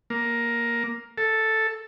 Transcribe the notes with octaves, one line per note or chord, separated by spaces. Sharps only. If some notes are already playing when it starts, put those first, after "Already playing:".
A#3
A4